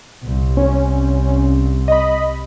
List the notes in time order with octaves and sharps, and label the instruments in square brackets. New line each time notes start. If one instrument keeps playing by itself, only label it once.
[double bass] C2
[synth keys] C#4
D#5 B5